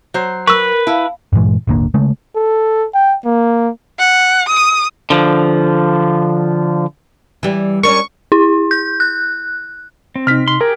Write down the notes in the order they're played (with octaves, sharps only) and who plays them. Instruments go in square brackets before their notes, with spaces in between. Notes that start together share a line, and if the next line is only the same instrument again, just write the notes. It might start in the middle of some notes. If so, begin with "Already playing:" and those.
[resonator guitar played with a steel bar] F#3 C5
[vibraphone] A#4 [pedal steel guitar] B4 [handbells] C#6 E6
[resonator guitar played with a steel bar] E4 [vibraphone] F5 A5
[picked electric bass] G2 A#2 E3 G#3
D#1 G#1 D3 A#3
C#3 G#3 A3
[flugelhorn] A4
G5
A#3
[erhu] F#5
D#6
[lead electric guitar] D3 F3
[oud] E3 G3
[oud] C#4 D4 A#4 [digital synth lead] C#6
[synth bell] E4
G6
F#6
[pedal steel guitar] C4
[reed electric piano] C3 D#4 [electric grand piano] F6 B6
[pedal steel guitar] C6
[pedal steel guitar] G4 G#4 G5 [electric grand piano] A#4